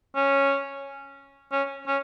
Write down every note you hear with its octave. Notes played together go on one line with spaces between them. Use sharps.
C#4
C#4
C#4